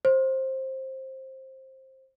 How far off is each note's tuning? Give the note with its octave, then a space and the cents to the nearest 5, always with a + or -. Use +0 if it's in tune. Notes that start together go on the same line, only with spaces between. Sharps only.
C5 +15